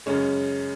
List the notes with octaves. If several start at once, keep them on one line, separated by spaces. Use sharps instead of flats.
F#2 C#3 G#3 C#4